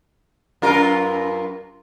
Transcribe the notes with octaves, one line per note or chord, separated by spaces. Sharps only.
F#2 F4 A#4